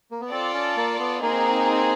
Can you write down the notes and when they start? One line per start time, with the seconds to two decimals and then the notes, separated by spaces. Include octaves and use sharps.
0.11 A#3
0.21 B3
0.31 C4 F4 A4 D5
0.54 C#4
0.77 A#3
1.00 B3
1.22 A#3 C4 D#4 G#4